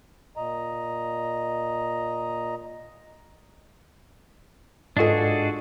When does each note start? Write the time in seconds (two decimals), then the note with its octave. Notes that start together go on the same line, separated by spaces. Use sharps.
0.37 A#2 D#5 A#5
4.97 G#2 D4 F4 F#4 G#4 A4 D#5